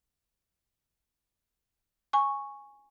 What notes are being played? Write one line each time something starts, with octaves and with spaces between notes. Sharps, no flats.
G#5 C#6